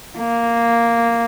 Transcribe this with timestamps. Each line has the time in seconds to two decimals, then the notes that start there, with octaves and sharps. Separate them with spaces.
0.18 A#3